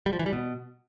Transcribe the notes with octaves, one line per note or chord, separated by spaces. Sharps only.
G3
F3
E3
G3
B2